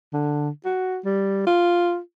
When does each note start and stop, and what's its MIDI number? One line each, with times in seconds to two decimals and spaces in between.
0.13 0.50 50
0.65 0.98 66
1.05 1.46 55
1.47 1.99 65